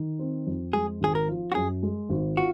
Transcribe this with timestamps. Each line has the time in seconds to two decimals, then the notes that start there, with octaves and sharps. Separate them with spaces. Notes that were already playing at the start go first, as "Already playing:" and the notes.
Already playing: D#3
0.19 C4
0.47 F2
0.73 G#3 G#4
1.01 G#1 G#4
1.15 A#4
1.28 F3
1.52 F#4
1.55 F#2 G#4
1.83 G#3
2.10 G#1
2.37 F4 F#4